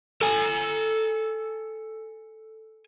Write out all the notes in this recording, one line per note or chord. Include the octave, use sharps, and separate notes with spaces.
A4 G#5